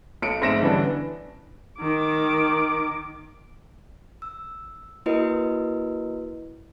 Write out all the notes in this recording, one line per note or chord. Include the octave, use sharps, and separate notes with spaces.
B1 C#7 D7
F1 G#2 E5 A#6 D7 E7
D3 E3 G3 B3 C#4 D4
D#3 D6
E6
A#3 E4 F#4 A#4 B4 D#5